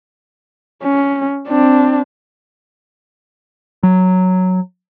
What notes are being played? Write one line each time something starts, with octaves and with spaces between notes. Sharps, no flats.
C#4
C4 D4
F#3